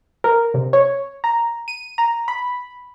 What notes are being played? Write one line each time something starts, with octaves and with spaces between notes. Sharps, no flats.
A#4
C3
C#5
A#5
D#7
A#5
B5